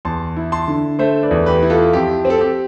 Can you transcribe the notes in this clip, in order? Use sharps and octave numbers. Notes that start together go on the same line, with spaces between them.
E2 A5 C6
E4
A5 C6
D3
A3 C5 E5
B4 D5
E2
G4 B4
E4
F4 A4
F2 G4
C4
A4
G4